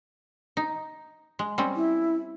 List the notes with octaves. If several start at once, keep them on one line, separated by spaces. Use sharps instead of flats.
D#4
G#3
G3 C4 C#4
E4